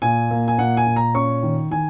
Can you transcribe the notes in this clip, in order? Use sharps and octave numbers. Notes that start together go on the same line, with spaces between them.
A#2 G#5
A#3
G#5
A#2 F#5
G#5
A#2
A#5
C#4 C#6
D#3
D#3 G#5